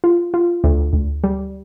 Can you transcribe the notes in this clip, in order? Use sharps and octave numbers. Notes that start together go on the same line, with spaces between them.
F4
F4
D2
D2
G3